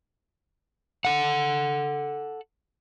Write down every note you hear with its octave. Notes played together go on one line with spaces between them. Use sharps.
A4 F#5